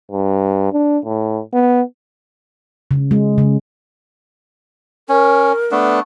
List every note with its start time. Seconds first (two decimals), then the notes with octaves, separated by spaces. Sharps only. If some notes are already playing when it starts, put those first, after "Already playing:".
0.11 G2
0.73 D4
1.05 A2
1.53 B3
2.91 C#3
3.11 G#3
3.38 C#3
5.09 C#4 A#4
5.71 A3 B3 D4